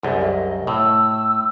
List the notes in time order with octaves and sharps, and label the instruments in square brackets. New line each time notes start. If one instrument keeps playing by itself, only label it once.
[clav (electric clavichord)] C2 F#2 [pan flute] G#4
[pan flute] D#5
[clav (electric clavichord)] A2 [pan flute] E6